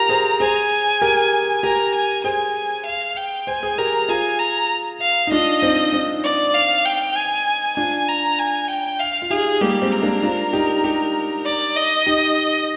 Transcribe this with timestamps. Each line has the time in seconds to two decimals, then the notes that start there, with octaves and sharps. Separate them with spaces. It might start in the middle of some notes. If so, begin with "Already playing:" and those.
Already playing: F4 G4 A#4 A#5
0.09 G#4 C5
0.40 G#4 C5 G#5
1.01 G4 A#4
1.63 G4 A#4 A#5
1.94 G#5
2.24 G#4 C5 G#5
2.85 F5
3.16 G5
3.47 C5 G#5
3.62 G#4 C5
3.78 G4 A#4 A#5
4.09 F4 G#4 G#5
4.39 A#5
5.01 F5
5.27 D#4
5.32 D4 F4 D#5
5.62 C4 D#4
5.93 C4 D#4
6.24 D5
6.54 F5
6.85 G5
7.16 G#5
7.76 D4 F4 G#5
8.08 A#5
8.38 G#5
8.70 G5
9.00 F5
9.22 F4
9.30 D#4 G4 G#4
9.61 G3 A#3 G4
9.82 G#3 C4
9.92 A#4
10.02 A#3 D4
10.22 D4 F4
10.53 D#4 G4
10.84 D#4 G4
11.46 D5
11.76 D#5
12.06 D#4 G4